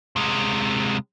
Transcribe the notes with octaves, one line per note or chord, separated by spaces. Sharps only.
C3 G#3